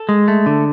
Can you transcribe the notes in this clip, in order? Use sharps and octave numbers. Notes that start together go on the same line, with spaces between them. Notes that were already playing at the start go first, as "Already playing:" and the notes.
Already playing: A4
G#3
A3
D3